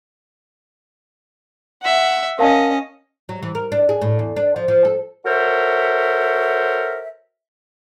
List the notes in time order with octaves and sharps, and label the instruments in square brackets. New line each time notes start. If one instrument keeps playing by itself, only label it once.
[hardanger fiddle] E5 F#5
[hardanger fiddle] C#4 D#5 [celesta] A#4 F5 A5
[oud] F#3
E3
A#4
D4
G#4
A2
E2
D4
F3
F3
A4
[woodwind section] F#4 A4 A#4 C5 C#5 E5